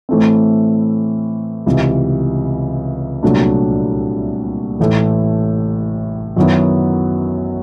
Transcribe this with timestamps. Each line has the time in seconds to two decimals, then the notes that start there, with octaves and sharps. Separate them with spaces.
0.09 A2 E3 A3 C4
1.66 C#2 C3 E3
3.23 C2 A#2 F#3 A3 D4
4.80 A1 A2 E3 A3
6.36 F#2 D#3 F#3 B3 E4